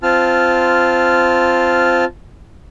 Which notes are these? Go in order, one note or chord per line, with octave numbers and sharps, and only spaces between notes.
C4 F4 A5 F6